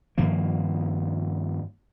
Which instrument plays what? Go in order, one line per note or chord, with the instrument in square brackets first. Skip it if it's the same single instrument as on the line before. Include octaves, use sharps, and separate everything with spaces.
[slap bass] G2 D#3 F3 A#3